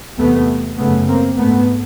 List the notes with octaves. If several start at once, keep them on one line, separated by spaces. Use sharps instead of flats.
E2 C3 A3 B3
F#2 C#3 A3 B3
A#3 C4
G#2 A3 B3